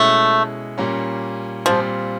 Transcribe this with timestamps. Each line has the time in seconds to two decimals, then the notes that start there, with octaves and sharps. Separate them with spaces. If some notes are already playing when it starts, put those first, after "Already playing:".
Already playing: B2 G#3 A3 C#4 E4
0.78 A#2 G3 A#3 C#4
1.66 A#2 F3 G3 C4 F4